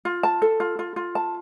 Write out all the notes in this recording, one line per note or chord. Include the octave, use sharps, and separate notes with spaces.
F4
A5
A4
F4
F4
F4
A5